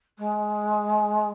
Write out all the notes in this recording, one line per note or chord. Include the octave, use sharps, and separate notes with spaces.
G#3